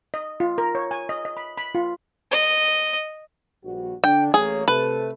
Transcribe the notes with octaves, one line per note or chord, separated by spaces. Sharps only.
D#5
F4
A#4
C#5
G#5
D#5
D#5
B5
B5
F4
D#5
A#1 G2 F#4
D3 D4 G5
A1 A#3 G#4 C#5
C3 A3 A4 B4